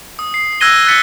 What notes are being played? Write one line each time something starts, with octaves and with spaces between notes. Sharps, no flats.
D#6
C7
E6 F#6 G#6 A#6 D#7 G7
E6 F#6 A6 B6 C#7 G7